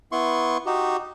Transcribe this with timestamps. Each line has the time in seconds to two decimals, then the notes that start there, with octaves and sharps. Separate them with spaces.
0.12 B3 E4 C6 C#6
0.66 D#4 F#4 G4